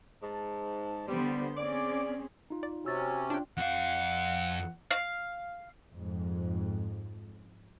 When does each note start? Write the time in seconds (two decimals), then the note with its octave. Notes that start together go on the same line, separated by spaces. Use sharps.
0.23 G#2 A5
1.07 D3 G3 B3 C5
1.57 C4 C#4 G#4 D5
2.50 D#4 F4
2.63 D5
2.85 C3 C#4 F#4 E6 A6
3.30 D4 F4 G5
3.58 F2 F5 F#5
4.91 F5
5.92 F2 G#2